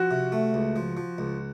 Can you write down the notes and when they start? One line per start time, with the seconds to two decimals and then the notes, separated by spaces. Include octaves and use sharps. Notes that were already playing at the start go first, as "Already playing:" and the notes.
Already playing: F3 F#4
0.11 C3
0.32 A3
0.54 C#2
0.76 F3
0.97 F3
1.18 C#2